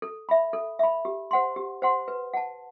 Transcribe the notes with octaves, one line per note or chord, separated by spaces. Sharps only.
A4
E5 B5
A4
E5 B5
G4
C5 F#5 C6
G4
C5 F#5 C6
B4
F#5 A5